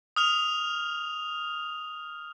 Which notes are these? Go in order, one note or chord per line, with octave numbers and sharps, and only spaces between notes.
D#6 F6 F7